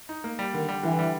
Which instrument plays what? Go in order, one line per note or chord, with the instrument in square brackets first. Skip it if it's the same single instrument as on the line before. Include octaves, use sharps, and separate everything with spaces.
[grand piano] D#4
A#3
G3
[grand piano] D3 [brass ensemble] D#3
[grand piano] G3
[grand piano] D3 [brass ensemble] E3
[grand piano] G3